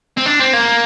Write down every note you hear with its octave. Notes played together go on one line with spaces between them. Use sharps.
C4
D4
C4
A#3